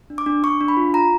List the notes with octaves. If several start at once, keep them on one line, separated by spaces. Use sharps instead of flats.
D4
D6
D4
D4 C#6
D4
B5
F4
F4 A#5